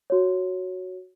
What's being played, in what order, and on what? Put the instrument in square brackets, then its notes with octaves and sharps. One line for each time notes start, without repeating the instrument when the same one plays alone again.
[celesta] F#4 C#5